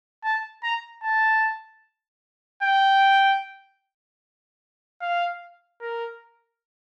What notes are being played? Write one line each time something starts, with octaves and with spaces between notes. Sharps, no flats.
A5
A#5
A5
G5
F5
A#4